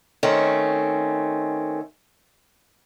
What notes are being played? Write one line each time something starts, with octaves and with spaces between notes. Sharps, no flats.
D#3 A3 C4 C#4